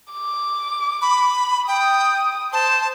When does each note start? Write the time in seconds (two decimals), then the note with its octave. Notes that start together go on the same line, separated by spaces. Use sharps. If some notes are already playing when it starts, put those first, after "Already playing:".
0.13 D6
1.02 B5
1.68 G5 D#6
2.53 C5 A5